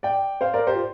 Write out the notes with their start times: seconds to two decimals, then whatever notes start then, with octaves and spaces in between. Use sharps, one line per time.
0.03 D5 G5
0.41 C5 F5
0.54 A#4 D5
0.67 G4 C5
0.75 F4